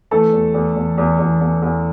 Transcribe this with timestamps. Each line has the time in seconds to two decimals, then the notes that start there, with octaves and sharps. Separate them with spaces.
0.11 E3 A3 A4
0.33 E2
0.54 E2
0.76 E2
0.98 E2
1.19 E2
1.40 E2
1.62 E2